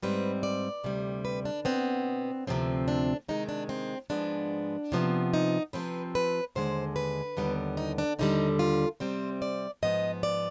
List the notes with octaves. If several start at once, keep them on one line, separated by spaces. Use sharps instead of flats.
G#2 G3 C4 B4
D5
D2 C3 G3
B4
D4
B2 B3 C4
D2 C3 F3 C4
D4
C3 D#3 G#3 D#4
D4
C4
G#2 F3 G#3 B3 D4
C3 F3 B3
D#4
C3 F3 C4 B4
B4
D#2 D3 G#3 C5
B4
D#2 D3 G3 B3
D#4
D4
D#2 D3 G3 D#4
F4
C3 G3 C4 C5
D5
G#2 F3 B3 D#5
D5